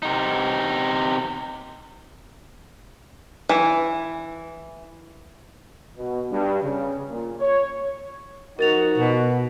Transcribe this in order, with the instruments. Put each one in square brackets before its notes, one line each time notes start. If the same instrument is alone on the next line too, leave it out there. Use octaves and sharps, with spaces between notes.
[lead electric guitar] C3 D#4
[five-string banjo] E3
[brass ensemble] B2
G2
C#3
A#2
C#5
[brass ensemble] F3 D#4 F#4 [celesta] A#4 A6 F7
[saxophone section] B2